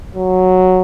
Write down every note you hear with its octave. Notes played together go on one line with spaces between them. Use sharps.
F#3